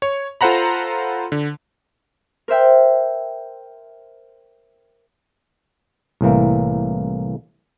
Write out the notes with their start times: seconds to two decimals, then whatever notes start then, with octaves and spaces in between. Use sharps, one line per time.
0.02 C#5
0.41 F4 A4 C5 F#5 A#5 B5
1.32 D3
2.48 A#4 C5 E5 G5
6.21 C2 A2 E3 A#3